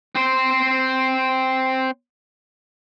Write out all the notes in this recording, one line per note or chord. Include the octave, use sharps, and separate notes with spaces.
C4 C5